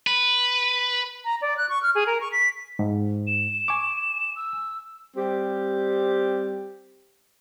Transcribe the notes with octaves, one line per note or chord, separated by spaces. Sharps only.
B4
A#5
D5
F#6
C#6
F6
G#4
A#4
C#6
B6
G#2
E7
G#5 C#6 D6
E6
G3 C4 G4